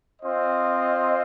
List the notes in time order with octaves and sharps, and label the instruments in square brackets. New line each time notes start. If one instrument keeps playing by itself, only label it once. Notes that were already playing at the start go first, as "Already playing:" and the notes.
[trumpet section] C4 F4 C5 D#5